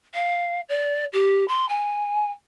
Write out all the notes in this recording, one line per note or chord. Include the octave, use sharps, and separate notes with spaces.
F5
D5
G4
C6
G#5